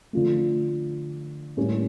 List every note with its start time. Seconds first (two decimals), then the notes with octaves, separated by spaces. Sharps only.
0.13 D3 F3 A3
1.57 A2 G3 A#3 C#4 G4